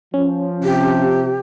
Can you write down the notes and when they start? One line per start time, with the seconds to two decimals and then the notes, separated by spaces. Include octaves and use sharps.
0.14 F3 C#4
0.64 C3 G4